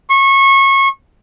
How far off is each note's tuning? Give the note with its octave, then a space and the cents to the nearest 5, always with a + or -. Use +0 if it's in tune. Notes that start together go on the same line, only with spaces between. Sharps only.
C#6 -25